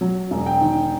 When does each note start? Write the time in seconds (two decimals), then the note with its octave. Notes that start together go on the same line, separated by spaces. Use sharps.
0.01 F#3
0.31 E1
0.46 G5
0.61 D#3